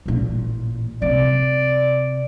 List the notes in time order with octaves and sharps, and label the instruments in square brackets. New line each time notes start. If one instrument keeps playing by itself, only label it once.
[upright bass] A1 A#2
[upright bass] C3 [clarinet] D5